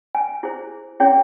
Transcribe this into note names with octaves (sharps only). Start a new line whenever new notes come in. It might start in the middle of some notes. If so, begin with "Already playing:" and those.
G#5
E4 G#4 C5
C#4 E4 G#4 C#5 G5